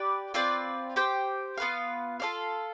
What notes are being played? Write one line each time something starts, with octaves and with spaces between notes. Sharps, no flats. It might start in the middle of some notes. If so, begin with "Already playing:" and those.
Already playing: G4 B4 D5
C4 F4 B4 D5
G4 C5 G5
B3 F4 B4 F5
F4 A4 D5 F5